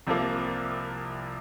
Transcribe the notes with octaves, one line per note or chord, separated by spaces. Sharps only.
C2 C3 F3 A#3